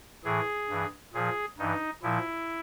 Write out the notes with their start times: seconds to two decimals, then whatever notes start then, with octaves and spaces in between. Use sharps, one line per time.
0.25 A2 E3 G#4
0.69 G2 E3
1.13 A#2 F3 G#4
1.58 G2 E3 D#4
2.02 A#2 F3 E4